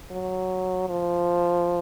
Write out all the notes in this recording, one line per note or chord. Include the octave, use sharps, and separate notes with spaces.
F#3
F3